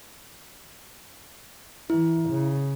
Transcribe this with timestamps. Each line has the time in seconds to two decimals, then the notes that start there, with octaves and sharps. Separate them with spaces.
1.90 E3 E4
2.29 C#3